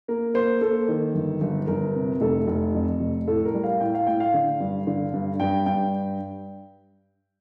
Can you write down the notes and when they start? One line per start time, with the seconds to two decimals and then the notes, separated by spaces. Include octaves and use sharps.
0.08 A#3 A#4
0.34 A#3 C5
0.61 A#3 A4
0.88 D#3
1.15 G1
1.41 G1
1.67 G1 A#4
1.95 C3
2.21 F1 A4
2.47 F1
2.74 F2
3.00 F1
3.27 A2 A4
3.45 A#4
3.54 G3
3.63 F5
3.80 A2 G5
3.94 F5
4.07 A2 G5
4.20 F5
4.34 D3
4.60 G2
4.87 D3
5.13 G2
5.40 G2 G5
5.66 G2 G5